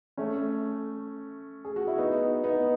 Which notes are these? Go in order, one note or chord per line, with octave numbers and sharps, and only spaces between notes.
A3 C#4
G#4
F#4
E4
B3 D#4
B3 D#4